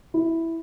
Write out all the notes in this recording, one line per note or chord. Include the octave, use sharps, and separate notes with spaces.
E4